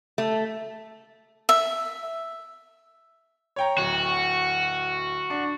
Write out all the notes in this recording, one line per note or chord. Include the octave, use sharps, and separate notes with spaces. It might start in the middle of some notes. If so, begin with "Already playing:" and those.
A3
E5
C#5 G5 A#5
D1 F#4
D4